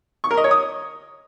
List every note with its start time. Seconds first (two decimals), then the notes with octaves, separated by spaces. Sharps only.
0.24 C#6
0.31 A#4
0.37 D#5
0.44 C#5
0.51 D#6